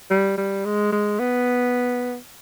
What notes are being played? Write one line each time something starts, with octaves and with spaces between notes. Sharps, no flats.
G3
G3
G#3
G#3
B3